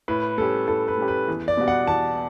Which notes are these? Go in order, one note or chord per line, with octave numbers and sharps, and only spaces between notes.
A2 B4
G3 C#4 G4 A4
A2 A4
B4
G3 C#4 G4
B4
E2
D5
B2 G3 B3 F#4
F#5
E2 A5